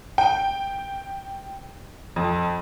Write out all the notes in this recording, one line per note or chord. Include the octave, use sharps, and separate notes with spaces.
G5
F2